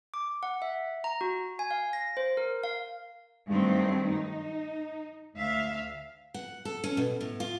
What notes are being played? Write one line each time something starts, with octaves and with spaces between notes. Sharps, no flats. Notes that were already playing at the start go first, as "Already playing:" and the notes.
D6
F#5
E5
A#5
F#4
G#5
F5
A#6
C5
A#4
F5
G2 D#3 F#3 A3 C4
D#4
D2 E5 F5
F#5
A4
C#4
B2
A2
F4